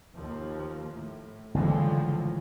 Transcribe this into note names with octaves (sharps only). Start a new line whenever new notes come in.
D#2 F3
A2
F#1 A2 D3 E3 F3 G#3